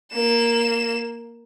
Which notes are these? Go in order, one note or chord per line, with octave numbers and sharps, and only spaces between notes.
A#3 E7